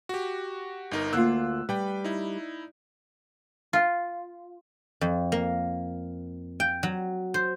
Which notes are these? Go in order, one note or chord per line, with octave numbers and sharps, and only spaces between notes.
F#4 G4
G1 D#4 A#4
D2 A#3 F4 E6 F#6
G3 B4 G5
D#4 E4
F4
F2
A#3
G5
F#3
C5